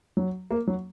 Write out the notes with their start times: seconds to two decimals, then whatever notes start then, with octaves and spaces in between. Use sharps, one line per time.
0.17 F#3
0.51 A#3
0.67 F#3